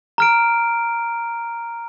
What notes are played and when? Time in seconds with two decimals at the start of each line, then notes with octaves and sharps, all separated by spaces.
0.18 A#5 F6 D7